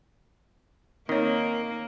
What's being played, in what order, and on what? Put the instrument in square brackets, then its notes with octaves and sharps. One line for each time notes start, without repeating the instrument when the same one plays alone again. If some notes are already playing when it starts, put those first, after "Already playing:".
[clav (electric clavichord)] D#3 [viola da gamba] A#3 [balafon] C4 C#5